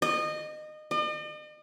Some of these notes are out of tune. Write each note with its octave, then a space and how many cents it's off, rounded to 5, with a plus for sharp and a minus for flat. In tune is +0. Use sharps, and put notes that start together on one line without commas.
D#5 -25
D#5 -45